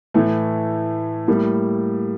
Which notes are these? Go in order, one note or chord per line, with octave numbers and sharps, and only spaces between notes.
A2 E3 A3
A2 G3 A#3